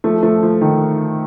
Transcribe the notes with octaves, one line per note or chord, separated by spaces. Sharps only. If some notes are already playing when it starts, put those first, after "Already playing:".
F3 A3
F3 A3
F3
D#3